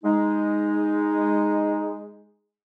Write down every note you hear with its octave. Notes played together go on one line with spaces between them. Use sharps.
G#3 D#4